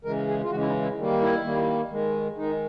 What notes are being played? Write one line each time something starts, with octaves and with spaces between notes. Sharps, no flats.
C#3 E3 G#3 A#4
G#4
F4
C#3 E3 G#3 F#4
E4
D#4
E4
D#3 G3 A#3
E4
D#3 G3 A#3
D#3 G#3
D#3 G#3 D#4